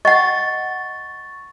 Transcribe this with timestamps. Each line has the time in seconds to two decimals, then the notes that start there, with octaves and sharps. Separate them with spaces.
0.05 D#5 F#5 C#6 A6